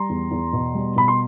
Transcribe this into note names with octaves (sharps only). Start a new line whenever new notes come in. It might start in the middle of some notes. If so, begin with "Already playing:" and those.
Already playing: G3 A#5 C6
E2
E2
B2
G3
B2 B5
C6